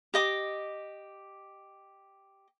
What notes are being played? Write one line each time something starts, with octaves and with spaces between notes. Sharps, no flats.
G4 D#5 D6